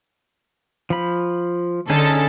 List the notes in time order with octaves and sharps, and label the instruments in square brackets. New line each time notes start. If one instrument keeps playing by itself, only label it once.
[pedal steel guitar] F3 B5
[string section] D3 A4 [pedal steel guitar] C#4 D#4 G#4